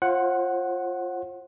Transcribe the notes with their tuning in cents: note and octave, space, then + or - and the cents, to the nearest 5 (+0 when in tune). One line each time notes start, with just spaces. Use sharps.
F4 +0 C5 +45 F#5 +0